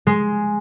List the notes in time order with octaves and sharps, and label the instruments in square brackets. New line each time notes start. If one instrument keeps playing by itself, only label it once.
[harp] G#3